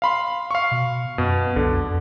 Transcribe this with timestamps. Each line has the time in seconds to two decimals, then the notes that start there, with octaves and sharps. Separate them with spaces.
0.02 F5 B5 C6
0.51 F5 C#6
0.71 B2
1.18 F#2 B2
1.56 B1 D3
1.75 F2